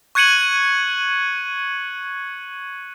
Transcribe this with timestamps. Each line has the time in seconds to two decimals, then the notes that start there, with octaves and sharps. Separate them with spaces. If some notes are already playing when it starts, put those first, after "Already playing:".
0.15 C#6 F#6 G#6 C#7 D#7 F#7